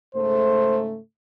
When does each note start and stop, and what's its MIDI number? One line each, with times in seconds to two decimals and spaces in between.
0.15 0.98 44
0.15 0.98 49
0.15 0.98 57
0.15 0.81 72